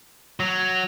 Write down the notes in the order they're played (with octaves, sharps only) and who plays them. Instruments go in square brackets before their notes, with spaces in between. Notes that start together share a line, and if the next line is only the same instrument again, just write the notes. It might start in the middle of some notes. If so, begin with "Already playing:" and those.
[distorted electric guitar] F#3